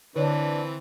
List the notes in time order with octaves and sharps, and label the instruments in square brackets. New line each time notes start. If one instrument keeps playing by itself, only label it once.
[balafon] D3 C#5 [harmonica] E3 C4 B4 [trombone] D4